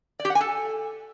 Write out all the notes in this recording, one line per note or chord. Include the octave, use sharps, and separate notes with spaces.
D5
G4
F#5
G#5
A4